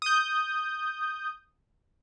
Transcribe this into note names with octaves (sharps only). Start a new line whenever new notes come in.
D#6 G6